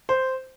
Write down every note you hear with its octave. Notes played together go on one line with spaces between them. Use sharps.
C5